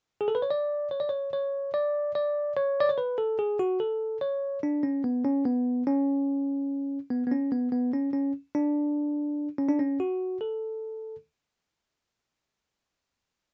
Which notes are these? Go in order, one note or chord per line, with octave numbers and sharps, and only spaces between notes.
G#4
A4
B4
C#5
D5
C#5
D5
C#5
C#5
D5
D5
C#5
D5
C#5
B4
A4
G#4
F#4
A4
C#5
D4
C#4
B3
C#4
B3
C#4
B3
B3
C#4
B3
B3
C#4
C#4
D4
C#4
D4
C#4
F#4
A4